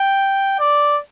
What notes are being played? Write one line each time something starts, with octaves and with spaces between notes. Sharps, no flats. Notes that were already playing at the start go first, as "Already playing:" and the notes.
Already playing: G5
D5